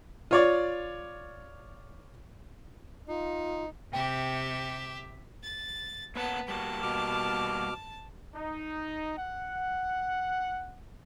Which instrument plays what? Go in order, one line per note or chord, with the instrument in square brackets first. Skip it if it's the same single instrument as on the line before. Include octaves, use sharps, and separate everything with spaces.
[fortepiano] F4 C#5 D5
[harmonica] D#4 [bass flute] F4
[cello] C3 [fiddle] G4 E5 [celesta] G5
[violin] A6
[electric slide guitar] A#3 C#5 F#5 [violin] B3 A5
[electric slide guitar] G3 A#3 F#4 [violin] A5
[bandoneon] B2 D6 F6
[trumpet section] D#4
F#5